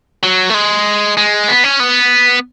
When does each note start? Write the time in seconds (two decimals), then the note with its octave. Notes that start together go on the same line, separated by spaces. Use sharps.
0.23 F#3
0.50 A3
0.54 G#3
1.17 G#3
1.48 B3
1.64 C#4
1.80 B3